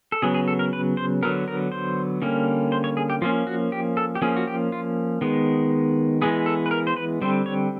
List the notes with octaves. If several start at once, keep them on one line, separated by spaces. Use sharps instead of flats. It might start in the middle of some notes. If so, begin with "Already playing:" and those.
A4
C#3 F#3 B3 G#4
G#4
A4
A#4
B4
C5
D3 F#3 B3 A#4
A#4
C5
D3 G3 A#3 C#4
C5
C#5
G#4
G4
F3 A#3 C#4 F4
F#4
G4
A4
G4
F3 A#3 C#4 G#4
F#4
G4
F4
D#3 G#3 B3
E3 G#3 B3 G#4
A4
B4
A#4
C5
B4
D3 G3 C4 C5
C#5